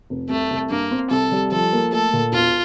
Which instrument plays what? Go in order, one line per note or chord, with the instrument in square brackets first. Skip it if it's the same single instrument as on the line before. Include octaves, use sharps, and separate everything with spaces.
[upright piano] F1
[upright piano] C2 [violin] A3
[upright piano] C2
[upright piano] G2 [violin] A#3
[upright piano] C4
[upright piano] C2 [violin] A4
[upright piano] G3
[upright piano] F3 [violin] A4
[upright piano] A#3
[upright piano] A3 [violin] A4
[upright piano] A#2
[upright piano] E1 [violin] F4